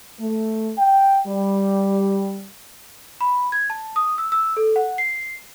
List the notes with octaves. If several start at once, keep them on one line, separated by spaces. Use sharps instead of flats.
A3
G5
G3
B5
G#6
A5
D#6
E6
E6
A4
F#5
C7